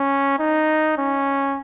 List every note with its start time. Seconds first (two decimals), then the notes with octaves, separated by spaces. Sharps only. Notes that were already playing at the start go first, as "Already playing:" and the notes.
Already playing: C#4
0.39 D#4
0.98 C#4